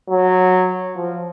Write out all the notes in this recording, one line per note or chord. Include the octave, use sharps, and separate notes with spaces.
F#3
F3